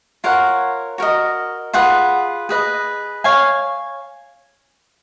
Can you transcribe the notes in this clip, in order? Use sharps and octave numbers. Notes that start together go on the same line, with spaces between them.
F4 A#4 C#5 F#5
F#4 A#4 D#5
F4 G#4 B4 F#5
G#4 B4 D#5
C#5 F5 G#5